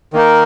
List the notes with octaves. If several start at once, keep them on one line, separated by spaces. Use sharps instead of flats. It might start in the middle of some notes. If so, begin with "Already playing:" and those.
D#3 A#3 D#4 A#4